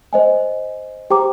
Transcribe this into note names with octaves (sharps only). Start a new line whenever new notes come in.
C5 D#5 G#5
G4 C5 G5 A#5 D6